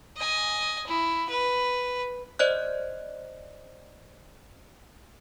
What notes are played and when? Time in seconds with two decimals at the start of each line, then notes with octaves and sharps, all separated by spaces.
0.17 D#5 G#5
0.87 E4
1.29 B4
2.39 C5 D5 D#5 F#6